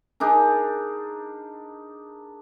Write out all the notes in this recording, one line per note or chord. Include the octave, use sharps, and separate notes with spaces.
D4 D#4 G#4 A#4